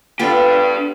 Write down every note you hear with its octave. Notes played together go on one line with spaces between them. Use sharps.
B3 D4 F4 G4 A4